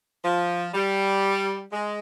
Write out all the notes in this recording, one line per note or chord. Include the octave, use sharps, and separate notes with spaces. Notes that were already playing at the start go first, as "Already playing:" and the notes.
F3
G3
G#3